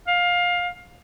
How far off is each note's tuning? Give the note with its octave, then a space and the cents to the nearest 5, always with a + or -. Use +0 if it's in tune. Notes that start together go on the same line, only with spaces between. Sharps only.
F5 +20